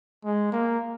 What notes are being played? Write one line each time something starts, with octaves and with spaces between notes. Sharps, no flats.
G#3
A#3